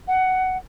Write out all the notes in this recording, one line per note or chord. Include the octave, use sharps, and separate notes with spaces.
F#5